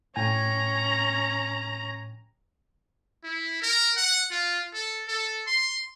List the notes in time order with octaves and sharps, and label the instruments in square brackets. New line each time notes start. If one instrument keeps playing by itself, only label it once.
[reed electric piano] A2 G5 G#5 [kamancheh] C#4 [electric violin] A#5
[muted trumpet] E4
A#4
F#5
F4
A4
A4
C6